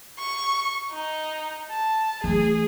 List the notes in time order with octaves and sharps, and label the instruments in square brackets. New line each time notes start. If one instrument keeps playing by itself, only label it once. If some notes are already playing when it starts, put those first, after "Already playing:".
[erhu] C#6
D#4
A5
[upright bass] E3 A3 [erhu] G#4